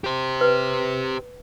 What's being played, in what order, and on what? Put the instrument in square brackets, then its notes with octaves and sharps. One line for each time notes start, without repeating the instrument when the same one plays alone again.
[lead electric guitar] G4 C5
[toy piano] B4